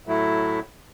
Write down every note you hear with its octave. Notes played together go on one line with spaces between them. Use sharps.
A2 F#3 A3 E4